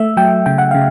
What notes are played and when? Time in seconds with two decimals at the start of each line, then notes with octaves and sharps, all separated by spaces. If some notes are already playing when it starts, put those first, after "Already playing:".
Already playing: A3 E5
0.17 F#3 G5
0.46 C#3 G5
0.58 F#5
0.71 C#3 F5